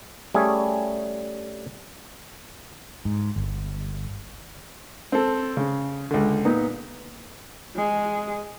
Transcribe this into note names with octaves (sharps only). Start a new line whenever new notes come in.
G3 A3 C#4 G#4
G#2
G1
C4 A4
C#3
C#2 D3
A#2 B3 D#4
G#3 G#4